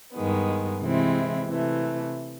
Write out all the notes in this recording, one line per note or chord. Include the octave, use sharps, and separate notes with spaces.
G2 D#3 G#3 B3
C3 E3 G#3 C4 E4
C3 E3 A3